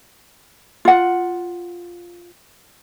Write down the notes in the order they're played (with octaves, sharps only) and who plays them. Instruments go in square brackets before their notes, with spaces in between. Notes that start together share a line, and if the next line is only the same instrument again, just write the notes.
[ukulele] F4 F#5